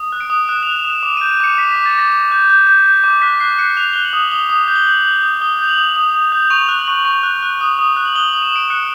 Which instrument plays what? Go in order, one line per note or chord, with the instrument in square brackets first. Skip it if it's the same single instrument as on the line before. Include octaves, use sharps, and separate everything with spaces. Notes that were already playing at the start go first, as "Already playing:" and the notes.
Already playing: [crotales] D#6
F#6
D7
D#6
F#6 E7
F#6 F7
E7
D#6
E7
D6 F7
G6 D#7
D#7
D6 C#7
D6 B6
D6 B6
A6
D6 A#6
D6
G6
G6
G6
G6
D6
F#6 B6
F#6 C7
F#6 C#7
F#6 F7
F#6 G7
F#7
D#6
D#6 G7
D#6
G6
G7
G6 F#7
G6
D#6
D#6 G7
G6 F7
F#7
D#6
D#6
D#6
G6
C#6 F7
F#6
F#7
C#6
C#6
F#6
F#6
D#6
D#6
F#6
F#7
D#6 G7
D#6 F#7
E7
D#6 D7
F#6 C#7